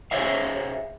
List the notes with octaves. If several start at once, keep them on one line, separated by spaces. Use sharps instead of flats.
G#4 C5 C#5 E5 F5